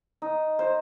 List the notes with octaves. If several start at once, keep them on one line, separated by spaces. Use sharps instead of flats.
D#4
C5